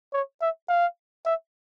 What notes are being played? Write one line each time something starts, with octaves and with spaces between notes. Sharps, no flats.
C#5
E5
F5
E5